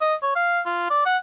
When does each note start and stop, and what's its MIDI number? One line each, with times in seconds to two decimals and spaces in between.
0.01 0.15 75
0.22 0.32 73
0.35 0.61 77
0.65 0.87 65
0.90 1.03 74
1.05 1.17 78